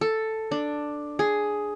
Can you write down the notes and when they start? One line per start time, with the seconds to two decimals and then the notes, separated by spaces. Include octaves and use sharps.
0.01 A4
0.51 D4
1.19 G#4